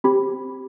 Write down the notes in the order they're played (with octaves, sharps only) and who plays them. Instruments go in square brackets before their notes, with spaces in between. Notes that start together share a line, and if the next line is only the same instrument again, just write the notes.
[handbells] C4 G4 B5